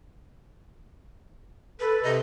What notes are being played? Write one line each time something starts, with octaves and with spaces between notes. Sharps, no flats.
A4 B4
C3 D#5